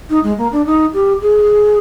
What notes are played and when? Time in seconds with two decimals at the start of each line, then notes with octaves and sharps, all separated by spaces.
0.10 D#4
0.23 G#3
0.38 A#3
0.52 D4
0.66 D#4
0.94 G4
1.21 G#4